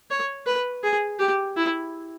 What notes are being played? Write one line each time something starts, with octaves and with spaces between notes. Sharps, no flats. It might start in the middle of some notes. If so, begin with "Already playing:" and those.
C#5
B4
G#4
G4
E4